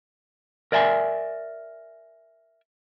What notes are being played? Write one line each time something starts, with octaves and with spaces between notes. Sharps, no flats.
A#4 D5 E5 G5 G#5